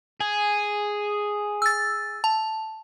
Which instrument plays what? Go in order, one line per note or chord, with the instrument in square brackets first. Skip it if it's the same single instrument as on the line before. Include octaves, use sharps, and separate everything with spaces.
[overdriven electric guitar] G#4
[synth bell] E6 A6
A5